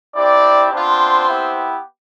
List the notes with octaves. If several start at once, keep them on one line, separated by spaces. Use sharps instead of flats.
C4 D4 E4 G4 D5
B3 C4 D4 F4 C5
B3 E4 G4